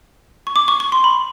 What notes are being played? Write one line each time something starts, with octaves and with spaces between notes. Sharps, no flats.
C#6
D6
C#6
C#6
C6
B5